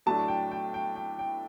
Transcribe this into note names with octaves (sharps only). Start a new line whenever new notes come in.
A2 F#3 A3 D4 A5
G5
G5
G5
G5
G5